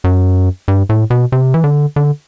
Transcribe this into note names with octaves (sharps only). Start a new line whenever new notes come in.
F#2
G2
A2
B2
C3
E3
D3
D3